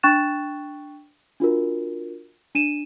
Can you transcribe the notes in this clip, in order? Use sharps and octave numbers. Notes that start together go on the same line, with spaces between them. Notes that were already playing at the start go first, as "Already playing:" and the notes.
D4 G5 C#6 F#6 A6 E7
D4 F4 F#4 A#4
D4 D#7 E7